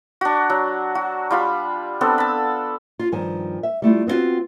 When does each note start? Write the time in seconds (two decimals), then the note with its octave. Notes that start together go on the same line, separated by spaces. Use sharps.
0.21 D4 F#4
0.50 F#3
0.95 F#4
1.31 G3 F4 B5
2.01 B3 C4 D4 A4
2.18 A5 B5
2.99 F4
3.12 G2 D#3 F3 G#5
3.63 E5
3.82 G3 A3 E4 F4
4.07 B3 C4 D4 F4 F#4